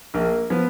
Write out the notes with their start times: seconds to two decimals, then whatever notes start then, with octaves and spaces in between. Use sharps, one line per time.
0.14 A#1 A#3
0.50 F3 B3